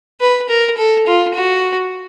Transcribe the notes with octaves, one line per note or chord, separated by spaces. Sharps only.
B4
A#4
A4
F4
F#4